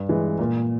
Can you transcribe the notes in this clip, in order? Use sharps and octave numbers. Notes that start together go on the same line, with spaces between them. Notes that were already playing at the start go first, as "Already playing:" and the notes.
Already playing: G2
E3 G#3
A#2